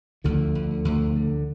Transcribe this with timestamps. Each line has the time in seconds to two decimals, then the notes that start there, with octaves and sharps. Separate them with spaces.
0.24 D2 D3 F3
0.55 D2
0.85 D2
1.16 D3